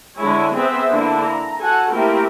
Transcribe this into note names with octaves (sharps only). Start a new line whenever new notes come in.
D3 G#3 E4 C#5 G#5
B3 C4 G#4 B4 C5 E5
D3 A#3 D4 E4
A#5
F#4 A4 F#5 G#5
A3 A#3 C4 E4 G4 A#4